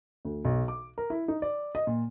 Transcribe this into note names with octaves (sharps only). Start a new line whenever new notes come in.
D2
B1
D6
A#4
E4
D#4
D5
D#5
A#2